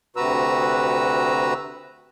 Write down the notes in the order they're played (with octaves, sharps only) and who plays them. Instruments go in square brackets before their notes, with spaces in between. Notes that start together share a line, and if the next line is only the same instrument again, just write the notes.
[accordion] D2 C3 F#4 B4 A#5 E6